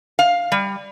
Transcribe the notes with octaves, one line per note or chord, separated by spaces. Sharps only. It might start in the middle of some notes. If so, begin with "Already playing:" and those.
F5
G3